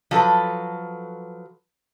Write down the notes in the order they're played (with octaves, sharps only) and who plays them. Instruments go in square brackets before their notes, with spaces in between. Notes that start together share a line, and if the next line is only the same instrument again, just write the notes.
[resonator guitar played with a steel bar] F3 F#3 A4 B4